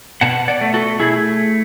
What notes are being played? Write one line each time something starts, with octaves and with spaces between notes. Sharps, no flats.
B2 F#5 A5
D5 F#5
A3
F#4 A4
A3 E4 G#4